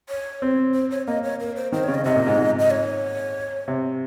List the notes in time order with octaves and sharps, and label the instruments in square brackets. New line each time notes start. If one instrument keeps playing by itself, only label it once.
[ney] C#5
[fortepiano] C4
[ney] C5
C#5
[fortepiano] A#3 [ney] D#5
[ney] C#5
A#4
C5
[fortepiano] D#3 [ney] C5
[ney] C#5
[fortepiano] C#3
[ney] D#5
[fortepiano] C3 [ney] D#5
[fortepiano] A#2
G#2
G#2
[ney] D#5
C#5
[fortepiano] C3